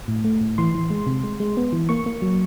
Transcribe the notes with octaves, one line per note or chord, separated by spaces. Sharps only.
A2
A3
A2
E3 C6
E3
G#3
C3
G#3
G#3
B3
E3
A#3 C#6
A#3
F#3